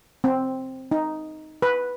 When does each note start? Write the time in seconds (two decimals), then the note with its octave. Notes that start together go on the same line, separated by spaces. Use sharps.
0.24 C4
0.91 D#4
1.62 B4